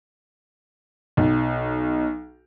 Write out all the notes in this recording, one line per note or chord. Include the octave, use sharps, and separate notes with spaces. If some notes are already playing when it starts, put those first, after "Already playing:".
B1